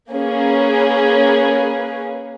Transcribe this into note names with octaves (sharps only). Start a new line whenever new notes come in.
A#3 C#4 G#4 B4